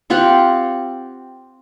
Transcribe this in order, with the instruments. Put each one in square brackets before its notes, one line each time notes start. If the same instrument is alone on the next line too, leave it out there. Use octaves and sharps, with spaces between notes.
[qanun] C4 F4 G4 F#5